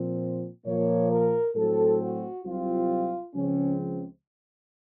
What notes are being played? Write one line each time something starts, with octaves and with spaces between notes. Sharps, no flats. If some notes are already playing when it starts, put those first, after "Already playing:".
Already playing: A#2 F3 C4
A#2 F3 A#3 C#5
A#4
A2 F#3 A3 C4 A4
F#4
C2 C3 F#3 C4 F4
C#2 C#3 F3 C4 C#4